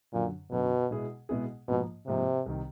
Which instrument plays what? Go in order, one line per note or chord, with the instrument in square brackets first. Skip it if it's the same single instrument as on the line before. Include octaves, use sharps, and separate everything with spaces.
[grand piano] F#2 D3 F#3 [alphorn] A#2
[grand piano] F#2 D3 F#3 [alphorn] B2
[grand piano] B2 G#3 B3 E4 G#4
B2 G#3 B3 E4 G#4
[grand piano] G#2 F3 A#3 [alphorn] B2
[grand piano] G#2 F3 A#3 [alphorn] C3
[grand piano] C2 C3 D#3